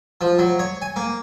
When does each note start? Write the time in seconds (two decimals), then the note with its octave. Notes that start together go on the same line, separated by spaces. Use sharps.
0.21 F3
0.39 F#3
0.59 C#5
0.82 G#5
0.96 A#3